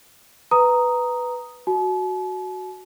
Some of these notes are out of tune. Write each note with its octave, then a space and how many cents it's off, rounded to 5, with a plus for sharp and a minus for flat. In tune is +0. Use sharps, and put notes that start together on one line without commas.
B4 +5 A#5 +0 D#6 +0
F#4 +0 A5 -45